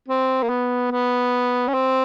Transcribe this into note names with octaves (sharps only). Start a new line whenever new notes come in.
C4
A#3
B3
B3
C#4
C4